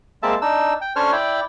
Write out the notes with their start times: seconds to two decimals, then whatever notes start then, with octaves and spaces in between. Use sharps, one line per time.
0.23 G#3 A#3 C4 E5 A5
0.42 D4 D#4 E6
0.81 G5
0.96 C#4 D4 A4 C5 C#5 F6
1.12 E4 D5 G5